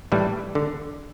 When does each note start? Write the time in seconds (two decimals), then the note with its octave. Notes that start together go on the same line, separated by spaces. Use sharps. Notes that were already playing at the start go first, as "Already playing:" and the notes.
0.12 A2 E3 G3
0.55 D3